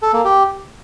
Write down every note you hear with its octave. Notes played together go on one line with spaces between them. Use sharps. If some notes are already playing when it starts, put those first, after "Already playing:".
A4
A#3
G4